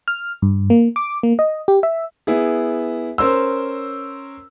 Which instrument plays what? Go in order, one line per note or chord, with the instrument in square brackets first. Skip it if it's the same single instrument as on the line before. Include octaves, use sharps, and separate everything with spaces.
[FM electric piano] F6
G2
A#3
D6
A#3
D#5
G4
E5
[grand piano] B3 E4 G#4
C#4 A#4 C5 C6 E6